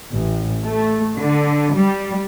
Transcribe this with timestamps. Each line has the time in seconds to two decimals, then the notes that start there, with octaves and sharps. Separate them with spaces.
0.14 A1
0.65 A3
1.18 D3
1.75 G3